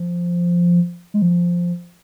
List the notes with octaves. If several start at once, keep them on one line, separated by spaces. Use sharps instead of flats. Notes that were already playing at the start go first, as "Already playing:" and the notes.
Already playing: F3
G#3
F3